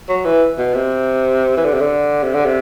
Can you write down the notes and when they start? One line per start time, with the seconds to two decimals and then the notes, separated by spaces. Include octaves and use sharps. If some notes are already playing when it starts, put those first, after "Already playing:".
0.09 F#3
0.25 E3
0.58 B2
0.74 C3
1.57 E3
1.65 D3
1.73 C3
1.81 D3
2.23 C3
2.34 D3
2.45 C3